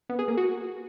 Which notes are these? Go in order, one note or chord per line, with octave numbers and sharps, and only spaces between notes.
B3
G#4
A#3
F#4